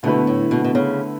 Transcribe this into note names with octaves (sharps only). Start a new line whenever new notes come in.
B2 D3 A3 E4 B4
A2
B2
B2
C#3